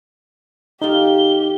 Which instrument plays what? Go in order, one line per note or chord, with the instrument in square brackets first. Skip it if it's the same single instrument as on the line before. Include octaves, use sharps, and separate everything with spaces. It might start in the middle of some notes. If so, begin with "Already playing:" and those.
[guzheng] F2 A#3 F4 [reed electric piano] D#4 [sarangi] G4 [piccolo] G7